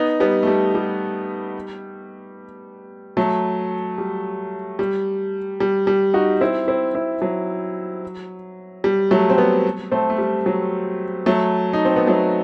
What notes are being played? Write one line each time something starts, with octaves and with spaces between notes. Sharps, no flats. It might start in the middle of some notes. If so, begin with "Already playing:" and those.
Already playing: B3 D#4
G3 B3
A3
G3
G3
F#3 A3
G3
G3
G3
G3
D#4 F#4
C4 E4
C4 E4
C4 E4
F#3
G3
F#3 A3
C4
G3 B3
A3 C4
A3
G3
F#3
F#3 A3
D#4
C4
B3
F#3 A3